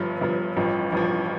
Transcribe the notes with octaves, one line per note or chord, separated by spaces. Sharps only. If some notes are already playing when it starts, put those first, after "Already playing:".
Already playing: G1 G2 F3
G1 G2 F3
A1 G2 F3
A1 G2 F3